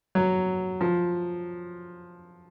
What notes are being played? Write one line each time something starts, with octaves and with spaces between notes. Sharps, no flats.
F#3
F3